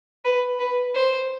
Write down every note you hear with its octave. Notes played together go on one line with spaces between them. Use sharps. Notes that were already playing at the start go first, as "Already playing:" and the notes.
B4
B4
C5